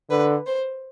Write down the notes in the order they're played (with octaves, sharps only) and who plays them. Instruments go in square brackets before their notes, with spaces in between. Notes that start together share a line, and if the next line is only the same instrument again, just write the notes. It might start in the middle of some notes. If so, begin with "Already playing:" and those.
[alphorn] D3 [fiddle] B4
[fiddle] C5